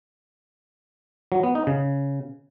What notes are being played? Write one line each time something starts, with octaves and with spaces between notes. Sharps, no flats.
F#3
B3
D#4
C#3